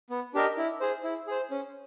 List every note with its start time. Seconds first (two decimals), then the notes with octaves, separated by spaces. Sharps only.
0.10 B3
0.34 D4 G4 A#4 D#5
0.57 E4
0.81 G#4 C5
1.04 E4
1.27 G#4 C5
1.51 C#4